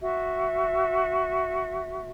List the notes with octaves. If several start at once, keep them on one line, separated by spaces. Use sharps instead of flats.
F#4 E5